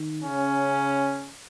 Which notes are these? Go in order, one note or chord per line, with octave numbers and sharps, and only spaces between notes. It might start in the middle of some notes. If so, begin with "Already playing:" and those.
Already playing: D#3
C#3 C#4